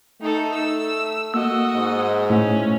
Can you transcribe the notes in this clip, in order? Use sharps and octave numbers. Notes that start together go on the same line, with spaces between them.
A3 D#4 A4
E6
A#3 F#4 D#5 E6
G#2
A2 A3 C#4